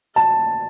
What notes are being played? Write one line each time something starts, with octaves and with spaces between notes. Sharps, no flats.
A5